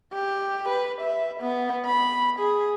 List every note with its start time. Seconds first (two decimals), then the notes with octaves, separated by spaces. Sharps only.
0.14 G4
0.69 B4
1.02 E5
1.41 B3
1.86 B5
2.39 G#4